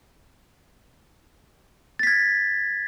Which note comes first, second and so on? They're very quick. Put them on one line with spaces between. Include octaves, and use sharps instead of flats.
A6 B6 G#6